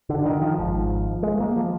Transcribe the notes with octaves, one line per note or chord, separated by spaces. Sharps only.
D3
D#3
F3
G#1 G#2
G#3
A#3
F3